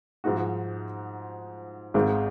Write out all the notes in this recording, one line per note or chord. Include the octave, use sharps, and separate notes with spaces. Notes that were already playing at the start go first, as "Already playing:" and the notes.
G#2 F3 G#3 D#4 F#4
G#1 G#2 D#3 G#3